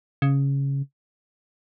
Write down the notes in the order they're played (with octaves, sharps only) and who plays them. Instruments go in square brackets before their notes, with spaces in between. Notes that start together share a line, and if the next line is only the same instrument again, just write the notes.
[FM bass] C#3